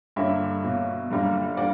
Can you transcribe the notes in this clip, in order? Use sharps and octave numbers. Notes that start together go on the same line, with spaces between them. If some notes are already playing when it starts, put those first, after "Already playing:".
G2 D3 G3 A#3 C#5 E5
B2 A#3
F#2 D3 G3 A#3
D3 G3 A#3 D5 F#5